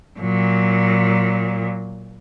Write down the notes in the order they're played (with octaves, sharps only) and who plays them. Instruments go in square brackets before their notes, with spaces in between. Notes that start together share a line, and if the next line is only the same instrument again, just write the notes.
[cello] A#2 F#3